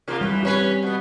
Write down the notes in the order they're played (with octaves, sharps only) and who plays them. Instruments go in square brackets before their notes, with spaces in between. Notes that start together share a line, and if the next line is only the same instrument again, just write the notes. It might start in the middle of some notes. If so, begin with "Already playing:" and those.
[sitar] C3 A#3 F4
[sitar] F2 E3 [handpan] G3
[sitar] A2 C#4 B4 [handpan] C4 G4
[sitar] B2 B3